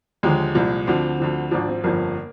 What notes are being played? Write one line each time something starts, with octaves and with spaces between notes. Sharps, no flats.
D#2 D3 F3 G#3
C2 A#2 F3
D2 D3 F3 C4
D2 D3 F3
G#1 G#2 F3 D4
C4
G1 F2 D3 F3 A#3